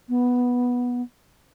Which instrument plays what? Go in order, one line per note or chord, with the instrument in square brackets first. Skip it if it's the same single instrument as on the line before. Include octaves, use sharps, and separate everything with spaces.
[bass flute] B3